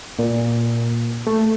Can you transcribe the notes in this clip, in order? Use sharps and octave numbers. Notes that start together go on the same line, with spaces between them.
A#2
A3